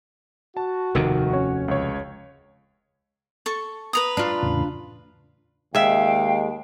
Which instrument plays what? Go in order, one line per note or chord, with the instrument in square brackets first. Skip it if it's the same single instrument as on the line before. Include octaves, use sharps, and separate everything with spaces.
[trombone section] F#4 [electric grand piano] A5
[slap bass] F1 D#2 C3 [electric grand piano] D#3
[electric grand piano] C#4 C#5
C#2 C#5
[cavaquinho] A4 C#6
B4 A#5 D#6
[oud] D4 F4
[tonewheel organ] E2 A2 C#3
[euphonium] D#2 [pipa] C#3 E5 [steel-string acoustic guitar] G#3 [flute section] F5 G5